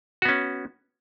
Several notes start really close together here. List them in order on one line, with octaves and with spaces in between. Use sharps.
F#4 B3 C#4